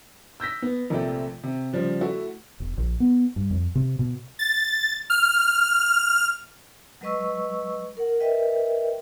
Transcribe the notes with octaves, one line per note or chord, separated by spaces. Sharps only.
E6 G6 A#6 B6
B3
A#1 C3 A3 D5 G5
C3
C#3 F3 G3
A3 E4 F#4
E1
A#1
B3
G2
F2
C3
B2
A6
F6
F#3 G#3 B4 D#5 C#6 E6
A#4 F#5
A#4 B4 D#5 E5 G5